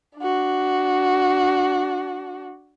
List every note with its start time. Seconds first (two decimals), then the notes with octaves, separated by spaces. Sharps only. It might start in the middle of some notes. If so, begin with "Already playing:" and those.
0.17 D4 F#4